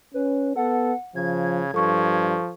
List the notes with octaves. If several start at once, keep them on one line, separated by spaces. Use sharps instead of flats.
C#4 B4
B3 A4 F#5
C#3 F3 G#6
G2 F3 A4 C#6